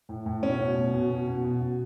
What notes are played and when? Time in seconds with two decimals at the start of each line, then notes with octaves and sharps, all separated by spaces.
0.09 A2
0.26 A2
0.42 B2 C#4
0.59 B2
0.76 B2
0.94 B2
1.11 B2
1.27 B2
1.44 B2
1.60 B2